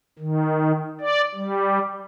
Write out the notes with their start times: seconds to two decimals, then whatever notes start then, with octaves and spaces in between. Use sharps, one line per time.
0.19 D#3
1.00 D5
1.35 G3